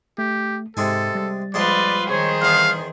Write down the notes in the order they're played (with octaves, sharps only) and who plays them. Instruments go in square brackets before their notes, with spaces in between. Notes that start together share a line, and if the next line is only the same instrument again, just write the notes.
[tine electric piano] A3 [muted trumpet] G4
[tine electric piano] G#2 [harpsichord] C3 G#3 G#5 [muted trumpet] A4
[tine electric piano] G3 A6
[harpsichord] A#1 G#3 A5 [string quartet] F4 B4 [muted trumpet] D5
[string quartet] D#3 G#4 C5 [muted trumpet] C#5
[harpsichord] E2 B3 [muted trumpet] F5